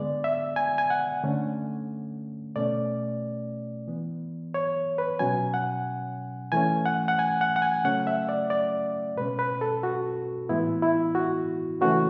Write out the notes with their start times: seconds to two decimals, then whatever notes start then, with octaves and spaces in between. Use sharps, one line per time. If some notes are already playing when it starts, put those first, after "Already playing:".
Already playing: D3 G#3 B3 D5
0.24 E5
0.56 G#5
0.78 G#5
0.90 F#5
1.23 D3 A3 C#4
2.56 B2 A3 C#4 D5
3.88 E3 B3
4.54 C#5
4.98 B4
5.19 B2 F#3 C#4 G#5
5.54 F#5
6.52 E3 A3 C#4 G#5
6.86 F#5
7.08 F#5
7.19 G#5
7.41 F#5
7.56 F#5
7.62 G#5
7.84 C#3 F#3 A3 C#4 F#5
8.07 E5
8.29 D5
8.50 D5
9.17 B2 G#3 C#4 B4
9.39 B4
9.61 A4
9.83 F#4
10.49 A2 E3 G#3 B3 E4
10.82 E4
11.15 F#4
11.81 C#3 E3 A3 C#4 F#4